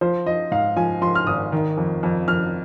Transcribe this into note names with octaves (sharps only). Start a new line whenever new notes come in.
F3 C5
F3 D#5
G#2 F5
F3 G#5
F3 C6
F6
G#1 D#6
D#3
F2
F2
F2 F6